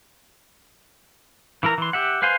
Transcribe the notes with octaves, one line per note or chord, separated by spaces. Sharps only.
E3 E4 A#4 A#5
E3 C6
G4 E5 F#5
B4 C5 F5 G#5 C6